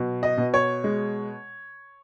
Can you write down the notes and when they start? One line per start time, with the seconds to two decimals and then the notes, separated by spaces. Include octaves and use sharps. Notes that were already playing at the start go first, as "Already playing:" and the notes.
Already playing: B2 F#3
0.23 D#5
0.37 B2
0.54 C#5
0.84 G#3